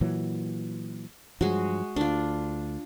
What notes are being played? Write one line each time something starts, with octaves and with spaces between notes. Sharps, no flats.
A#2 E3 F#3
G2 F3 F#3 G#3 F#4
D2 D4 F4